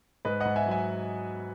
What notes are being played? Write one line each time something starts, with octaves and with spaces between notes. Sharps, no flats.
G#2 B4 D#5
G#2 D#5 F#5
E5 G#5
F#3
E5 G#5